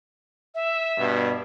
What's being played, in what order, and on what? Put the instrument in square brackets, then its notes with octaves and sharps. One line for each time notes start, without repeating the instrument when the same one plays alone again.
[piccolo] E5
[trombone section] G2 B2